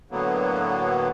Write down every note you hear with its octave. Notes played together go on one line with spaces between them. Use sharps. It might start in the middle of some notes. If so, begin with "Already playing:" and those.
A2 D3 F#3 A#3 B3